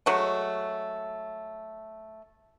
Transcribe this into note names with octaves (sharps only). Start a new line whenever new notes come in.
F#3 G#3 A3